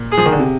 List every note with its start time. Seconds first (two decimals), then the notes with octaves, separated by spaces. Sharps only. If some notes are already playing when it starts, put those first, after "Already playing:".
Already playing: A#2
0.12 G#4
0.17 F3
0.26 D#3
0.32 D3
0.39 C3